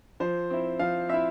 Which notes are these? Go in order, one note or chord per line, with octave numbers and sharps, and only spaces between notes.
F3 C5
C4 E4
F3 F5
C4 E4 E5